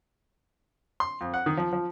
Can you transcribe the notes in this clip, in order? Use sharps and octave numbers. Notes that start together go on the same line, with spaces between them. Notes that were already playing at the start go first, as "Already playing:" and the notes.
C6
F2
F#5
D#3
F3
F3